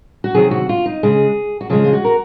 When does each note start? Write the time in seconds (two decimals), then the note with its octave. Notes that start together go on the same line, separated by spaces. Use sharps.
0.24 F#4
0.34 C3 D#3 F#3 G#4
0.51 F#4
0.69 F4
0.86 D#4
1.03 C#3 G#3 G#4
1.61 F#4
1.70 C#3 F3 G#3 G#4
1.84 F4
1.93 F#4
2.05 A#4